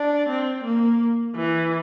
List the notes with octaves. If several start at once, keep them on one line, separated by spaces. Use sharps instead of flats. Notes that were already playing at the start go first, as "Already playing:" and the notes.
Already playing: D4
C4
A#3
E3